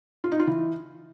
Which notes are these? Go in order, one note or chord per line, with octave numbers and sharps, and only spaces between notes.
F4
D#4
F4
E3